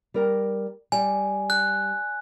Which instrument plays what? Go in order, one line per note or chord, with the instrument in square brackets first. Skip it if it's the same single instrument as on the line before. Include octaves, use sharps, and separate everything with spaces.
[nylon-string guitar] G3 A#4 G5
[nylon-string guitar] G3 [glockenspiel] G#5
[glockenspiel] F#6